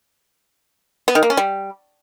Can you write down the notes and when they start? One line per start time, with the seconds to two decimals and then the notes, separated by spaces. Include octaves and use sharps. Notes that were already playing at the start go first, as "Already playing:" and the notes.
1.08 B3
1.15 D#3
1.23 A#3
1.30 C#4
1.37 G3